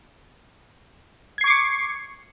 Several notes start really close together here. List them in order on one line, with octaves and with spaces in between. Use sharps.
G#6 C7 C#6 D6 C#7